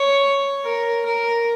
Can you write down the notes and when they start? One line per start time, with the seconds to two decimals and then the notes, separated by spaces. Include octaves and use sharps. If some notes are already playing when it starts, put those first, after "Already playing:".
Already playing: C#5
0.64 A#4
1.05 A#4